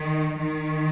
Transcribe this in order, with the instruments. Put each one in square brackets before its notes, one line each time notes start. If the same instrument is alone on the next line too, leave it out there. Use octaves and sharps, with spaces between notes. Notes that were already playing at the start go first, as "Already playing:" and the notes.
Already playing: [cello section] D#3
D#3